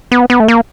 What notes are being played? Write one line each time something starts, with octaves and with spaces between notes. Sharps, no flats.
B3
B3
A3
A#3